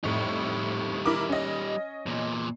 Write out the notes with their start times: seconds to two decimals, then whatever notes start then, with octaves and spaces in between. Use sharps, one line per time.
0.04 F2 A2 G3 D#4
1.05 E4 A#4 D6
1.29 C#4 D#5
2.06 E2 A#2